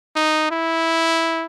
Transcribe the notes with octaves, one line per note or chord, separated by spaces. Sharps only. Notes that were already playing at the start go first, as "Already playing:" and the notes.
D#4
E4